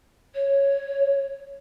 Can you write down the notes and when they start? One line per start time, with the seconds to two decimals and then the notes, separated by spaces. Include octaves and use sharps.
0.34 C#5